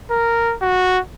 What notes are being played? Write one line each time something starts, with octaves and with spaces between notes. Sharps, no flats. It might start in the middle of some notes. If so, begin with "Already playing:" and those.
A#4
F#4